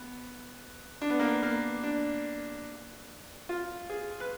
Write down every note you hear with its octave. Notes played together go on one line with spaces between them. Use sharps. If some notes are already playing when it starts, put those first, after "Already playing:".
Already playing: B3
D4
B3
A#3
B3
A#3
D4
F4
G#4
B4